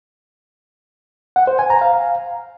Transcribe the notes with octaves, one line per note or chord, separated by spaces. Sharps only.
F#5
C5
G#5
A#5
F5